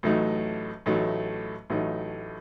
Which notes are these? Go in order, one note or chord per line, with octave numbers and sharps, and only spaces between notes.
A1 A2 F#3 A3 D#4
A1 A2 F#3 A3 D#4
A1 A2 F#3 A3 D#4